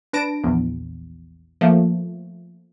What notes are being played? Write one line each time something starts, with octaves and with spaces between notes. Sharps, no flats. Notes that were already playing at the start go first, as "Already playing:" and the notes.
D4 B4 A5 A#6 D7
A#1 E2
F3 A3 A#3